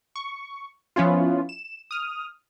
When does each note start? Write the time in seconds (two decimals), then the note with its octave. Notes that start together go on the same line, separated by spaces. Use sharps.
0.16 C#6
0.96 F3 B3 C#4 E4 F4
1.49 E7
1.91 D#6 F6